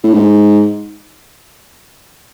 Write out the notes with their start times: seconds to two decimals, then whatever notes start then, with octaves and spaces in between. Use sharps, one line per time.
0.04 A2
0.14 G#2